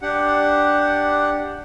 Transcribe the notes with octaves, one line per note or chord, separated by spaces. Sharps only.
D4 G4 F#5